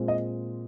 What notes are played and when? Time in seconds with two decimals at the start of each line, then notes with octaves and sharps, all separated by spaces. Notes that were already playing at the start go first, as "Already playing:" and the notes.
Already playing: A#2 G#3 C4
0.08 D#5